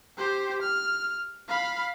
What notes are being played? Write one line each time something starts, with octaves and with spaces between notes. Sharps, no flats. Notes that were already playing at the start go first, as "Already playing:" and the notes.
G4 C5
F6
F5 B5